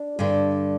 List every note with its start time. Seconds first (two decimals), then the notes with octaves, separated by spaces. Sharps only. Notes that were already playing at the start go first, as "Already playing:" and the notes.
Already playing: D4
0.19 G2 D3